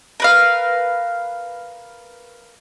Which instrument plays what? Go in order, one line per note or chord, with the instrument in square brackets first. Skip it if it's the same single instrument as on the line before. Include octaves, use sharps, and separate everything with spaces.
[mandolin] A#4 B4 F5